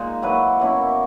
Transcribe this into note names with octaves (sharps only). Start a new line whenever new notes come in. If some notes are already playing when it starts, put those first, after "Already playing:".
Already playing: A#2 G#3 D#4
F#3 A#3 E4 B4
B2 A#3 C#4 E4